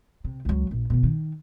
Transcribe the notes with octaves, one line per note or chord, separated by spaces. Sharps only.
C3
C#2 F#3
A#1
B2 D3
D#3